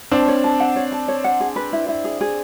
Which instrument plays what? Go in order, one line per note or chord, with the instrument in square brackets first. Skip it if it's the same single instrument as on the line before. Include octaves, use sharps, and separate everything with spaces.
[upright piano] C4 D4 [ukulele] A5
[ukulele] C#5
A5
F#5
C#5
A5
C#5
F#5
G#4
B4
E4
E4
G#4
G#4